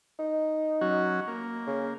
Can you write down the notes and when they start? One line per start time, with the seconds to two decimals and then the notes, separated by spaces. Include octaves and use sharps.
0.19 D#4
0.81 F#3 C#4 F#4
1.28 A#3
1.67 C#3